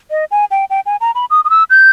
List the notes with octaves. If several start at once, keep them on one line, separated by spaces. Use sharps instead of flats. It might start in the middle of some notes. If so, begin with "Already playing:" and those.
D#5
G#5
G5
G5
G#5
A#5
B5
D#6
D#6
E6
G6